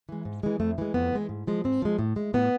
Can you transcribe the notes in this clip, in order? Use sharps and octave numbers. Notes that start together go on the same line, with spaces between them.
E3 G#3
G#2
E3 G#3
F2 A3
E3 G#3
F2 B3
E3 G#3
G#2
F3 G#3
G#2 C4
F3 G#3
A2
G#3
A2 B3